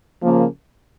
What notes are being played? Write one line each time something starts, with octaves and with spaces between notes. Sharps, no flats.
C#3 F3 A#3